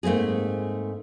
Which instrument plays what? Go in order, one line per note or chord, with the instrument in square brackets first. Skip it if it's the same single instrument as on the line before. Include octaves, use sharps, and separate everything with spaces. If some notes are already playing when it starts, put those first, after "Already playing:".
[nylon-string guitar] G#2 A3 A#3 C4 G#4